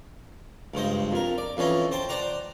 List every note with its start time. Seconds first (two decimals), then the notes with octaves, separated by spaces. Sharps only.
0.74 C#2 G2 C5 D#5
1.12 F2 A#4
1.38 D5
1.57 F2 E3 C#4 D#5
1.92 C5 G5 A5 C6
2.09 C5 D5 F#5 A#5